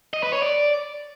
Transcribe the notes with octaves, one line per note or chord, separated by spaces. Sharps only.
D#5
B4
C#5
D5